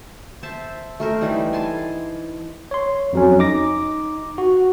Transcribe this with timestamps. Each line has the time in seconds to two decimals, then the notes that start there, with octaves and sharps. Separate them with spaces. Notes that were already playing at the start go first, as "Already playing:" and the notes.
0.43 C5 E5 A5
1.00 A3 A#4 C5
1.21 E3 G3 D#4
1.53 G#5 A5 C6
2.71 C#5 C6
3.13 F2 F#3 C#4
3.39 D#4 D6 A#6
4.38 F#4